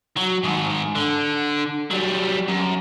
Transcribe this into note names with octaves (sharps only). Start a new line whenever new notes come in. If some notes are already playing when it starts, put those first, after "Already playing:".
F#3
G#2 D#3
D3
F#3 G3
F#2